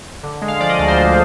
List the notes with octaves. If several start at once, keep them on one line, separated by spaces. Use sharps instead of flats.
D3
G#3
F5
F3 D5
D#5
D2 D5
C5
D3